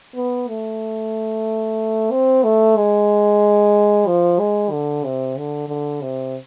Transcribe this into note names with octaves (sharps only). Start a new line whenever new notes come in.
B3
A3
C4
A3
G#3
F3
G#3
D3
C3
D3
D3
C3